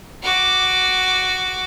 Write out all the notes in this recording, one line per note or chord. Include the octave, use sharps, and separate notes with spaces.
F#4 D6